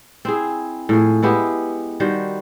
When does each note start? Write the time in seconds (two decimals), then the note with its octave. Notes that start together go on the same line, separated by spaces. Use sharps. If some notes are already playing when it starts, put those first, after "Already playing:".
0.25 C4 E4 G#4
0.89 A2 F3 G#4
1.23 G#3 B3 E4 G4
2.00 D#3 G3 F#4 C5